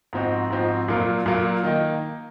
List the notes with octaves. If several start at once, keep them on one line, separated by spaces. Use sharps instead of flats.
G#2 F3 C4 D#4 F#4
G#2 F3 C4 D#4 F#4
A#2 F#3 A#3 F4
A#2 F#3 A#3 F4
D#3 A#3 D#4